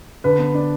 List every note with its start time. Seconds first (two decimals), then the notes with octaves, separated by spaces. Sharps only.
0.24 D3 B4
0.38 B3
0.54 D4